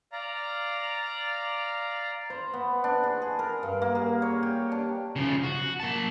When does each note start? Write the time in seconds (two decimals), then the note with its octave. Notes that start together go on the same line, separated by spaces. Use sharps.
0.12 D5 F5 A#5
2.30 C5
2.54 B3
2.84 D4
3.04 G#4
3.22 G#4
3.39 A#4
3.63 G2
3.82 A#3
3.95 G#4
4.22 C#5
4.43 G4
4.72 D4
5.16 C#3 F3
5.44 F#4
5.80 A#3 A5